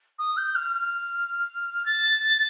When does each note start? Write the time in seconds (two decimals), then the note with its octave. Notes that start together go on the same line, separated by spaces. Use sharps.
0.19 D#6
0.37 G6
0.55 F6
0.74 F6
1.86 A6